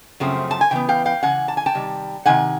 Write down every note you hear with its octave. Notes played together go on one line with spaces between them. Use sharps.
F#2 C#3 F3 A3 C4
A5
G#5
C#3 E3 B3 G5
F5 G5
F5 G5
C#3 E3 F#5 G#5
A5
G#5
G5 A5
C3 D#3 G3
C3 D#3 F#5 G#5